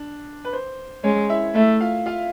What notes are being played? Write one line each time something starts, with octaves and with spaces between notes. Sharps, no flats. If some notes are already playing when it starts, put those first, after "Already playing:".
Already playing: D4
B4
C5
G#3 C#4 C#5
E4 E5
A3 E4 E5
F4 F5
F4 F5